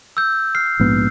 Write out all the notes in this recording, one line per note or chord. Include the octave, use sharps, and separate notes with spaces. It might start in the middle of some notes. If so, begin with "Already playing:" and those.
E6 G6
F6 C7
A#1 G#2 B3